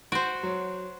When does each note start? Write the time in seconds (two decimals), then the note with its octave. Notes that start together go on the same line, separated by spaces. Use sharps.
0.12 F#4 C5 D7
0.43 F#3